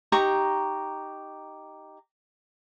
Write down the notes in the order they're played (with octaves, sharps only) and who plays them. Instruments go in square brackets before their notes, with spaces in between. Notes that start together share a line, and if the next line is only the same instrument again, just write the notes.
[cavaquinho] D#4 G4 A#5 C#6